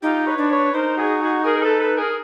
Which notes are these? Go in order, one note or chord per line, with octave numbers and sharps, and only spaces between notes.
D#4 F4 G4
B4 C#5
D4
B4 C#5
D#4 A#4 C5
F#4 G#4
F#4 G#4
G#4 A#4
A#4
A4 B4
A4 B4
G#4 A#4